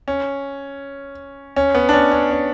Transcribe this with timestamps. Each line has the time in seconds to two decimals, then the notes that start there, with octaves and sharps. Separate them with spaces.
0.08 C#4
1.56 C#4
1.75 B3
1.89 D4
1.93 C#4
2.11 C#4
2.31 C#4